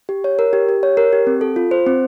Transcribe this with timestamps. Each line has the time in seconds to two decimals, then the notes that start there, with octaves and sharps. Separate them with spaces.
0.09 G4
0.24 C#5
0.39 A#4
0.53 G4
0.69 G4
0.83 C#5
0.97 A#4
1.13 G4
1.27 C4
1.41 A4
1.56 F4
1.71 C5
1.86 C4